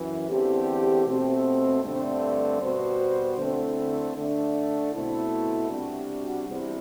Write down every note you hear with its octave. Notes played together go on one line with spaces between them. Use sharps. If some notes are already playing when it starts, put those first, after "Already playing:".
Already playing: F#2 E3
E2 D3 A3 C4 G4
B2 A3 C4
G2 D3 A3 C4
B2 G3 B3 F#4 C5
D3 A3 C4 E4
D3 A3 D4
B2 A3 C4 E4
C3 G3 D4 F#4
E2 C3 G3